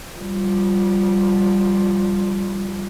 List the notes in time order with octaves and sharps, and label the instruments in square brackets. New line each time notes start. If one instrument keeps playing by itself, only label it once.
[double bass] F3 G3